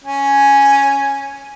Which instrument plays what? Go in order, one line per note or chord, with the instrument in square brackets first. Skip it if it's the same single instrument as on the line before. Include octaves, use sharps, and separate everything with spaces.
[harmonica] C#4 G#5